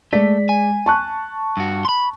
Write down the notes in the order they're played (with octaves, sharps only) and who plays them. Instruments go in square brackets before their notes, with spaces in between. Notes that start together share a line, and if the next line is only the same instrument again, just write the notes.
[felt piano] G#3 D5 B6 [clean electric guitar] A3
[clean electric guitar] G#5
[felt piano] A5 C#6 F#6
[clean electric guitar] G2 F#4
B5 C6